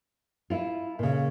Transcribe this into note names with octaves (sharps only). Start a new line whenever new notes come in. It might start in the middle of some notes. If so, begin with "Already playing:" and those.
E4 F4
A#2 C#3